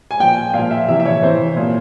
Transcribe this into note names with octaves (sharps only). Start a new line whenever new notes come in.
G#5
A#2 F3 G5
A#2 F3 F5
E5
C3 E3 E5
E5
C#5
C3 E3 C5
A#2 F3